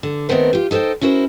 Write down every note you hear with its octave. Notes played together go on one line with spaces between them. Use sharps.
D3
D#3 G3 A3 B3 C4 A#4
F4 G4
D#4 A4 B4 C5 G5
C#4 E4 F#4 A#4 C5